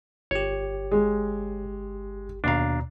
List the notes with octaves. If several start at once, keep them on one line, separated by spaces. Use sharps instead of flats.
G1 G4 C#5
G#3
D#2 B2 D4 F5 A#5